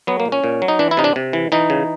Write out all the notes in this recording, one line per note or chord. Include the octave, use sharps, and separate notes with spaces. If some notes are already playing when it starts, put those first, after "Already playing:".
F#3 B3
A#3
A#2
C#4
A#2
F#3
D#4
E3 D4
E4
C3 D#4
D4
C3
E3
E3 D#4
C#3